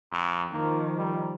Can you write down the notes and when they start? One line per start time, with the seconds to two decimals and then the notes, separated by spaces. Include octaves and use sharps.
0.12 F2
0.53 D#3 F3 A#3
0.98 G3